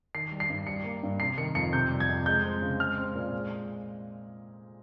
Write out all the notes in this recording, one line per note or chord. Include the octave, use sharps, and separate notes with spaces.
D#3 C7
G3
C7
G2
G3 C#7
A#3
G2
C3 C7
D#3 C#7
F2 C#7
C3 G6
G3
G#6
F2
G#3 G6
C4
C#3
G#3 F6
C4
A#2
G#3